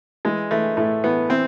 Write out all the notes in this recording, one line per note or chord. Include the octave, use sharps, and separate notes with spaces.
E3 G#3
E3 A3
A2 A3
E3 B3
E3 C4